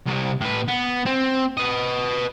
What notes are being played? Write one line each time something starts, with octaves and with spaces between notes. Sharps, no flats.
C2 C3
A2 B4
B3
C4
B4 D#5